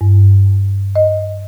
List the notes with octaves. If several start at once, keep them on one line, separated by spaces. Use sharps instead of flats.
G2
D#5